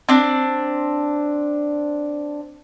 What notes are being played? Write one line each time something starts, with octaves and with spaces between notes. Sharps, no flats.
C4 D4